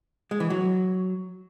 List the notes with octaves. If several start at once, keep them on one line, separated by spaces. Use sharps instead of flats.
G#3
E3
F#3